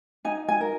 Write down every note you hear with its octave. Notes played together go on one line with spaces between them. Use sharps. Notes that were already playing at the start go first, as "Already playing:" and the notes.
D#4 G#5
G#5
A#4